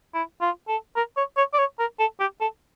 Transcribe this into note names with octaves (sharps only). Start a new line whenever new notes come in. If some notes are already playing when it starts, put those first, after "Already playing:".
E4
F4
A4
A#4
C#5
C#5
D5
C#5
A#4
A4
G4
A4